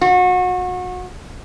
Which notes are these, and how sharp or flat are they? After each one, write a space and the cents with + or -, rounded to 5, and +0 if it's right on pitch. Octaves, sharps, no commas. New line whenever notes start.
F#4 -30